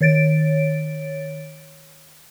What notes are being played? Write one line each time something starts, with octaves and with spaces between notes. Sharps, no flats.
D#3 C#5 A6 D7